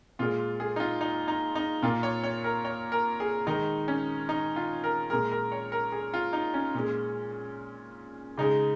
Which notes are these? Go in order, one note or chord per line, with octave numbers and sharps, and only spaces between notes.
A#2 G#3 F4
G#4
D#4
F4
D#4
D#4
D#4
A#2 A#3 F4
C#5
C#5
A#4
C#5
A#4
G#4
D#3 G#3 D#4
C#4
D#4
F4
A#4
A#2 G#3 A#4
A#4
C#5
A#4
G#4
F4
D#4
C#4
A#2 G#3
C#3 G#3 D#4